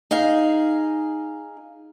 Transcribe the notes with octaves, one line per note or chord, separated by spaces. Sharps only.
D#4 G#4 F5